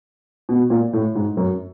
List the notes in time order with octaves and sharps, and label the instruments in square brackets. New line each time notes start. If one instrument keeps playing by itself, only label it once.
[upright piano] B2
A#2
A2
G#2
F#2